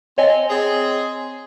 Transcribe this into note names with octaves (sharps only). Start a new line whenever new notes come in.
C4 C#5 D#5 G#5
C4 G#4